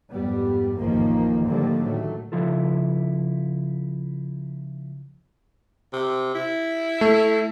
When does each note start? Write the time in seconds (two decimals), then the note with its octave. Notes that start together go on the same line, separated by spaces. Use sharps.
0.11 F2 G#2 G3 B3
0.78 A1 F2 D#3 F3 A#3
1.45 A2 D3 D#3 F3 G3 A#3
1.84 F#3 A3
2.32 C#3 F3 E4 F4 A4
5.93 C3
6.34 E4
7.01 A3